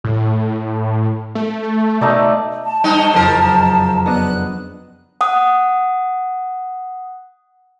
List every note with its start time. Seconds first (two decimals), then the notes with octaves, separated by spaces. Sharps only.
0.04 A2
1.35 A3
2.01 B2 A3 D#4 D5
2.63 A5
2.84 G2 D#4 G5 F#6
3.14 F#1 F2 F3 A#4 C7
4.06 B3 D4 D#5 F#6
5.21 F#5 D#6